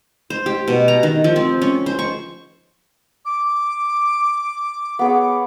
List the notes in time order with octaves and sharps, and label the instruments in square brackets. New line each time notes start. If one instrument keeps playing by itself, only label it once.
[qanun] C5
G4
B2
A#5
D#3
F3
C4
C#4
C5
C#6
[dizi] D6
[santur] B3 G#4 C#5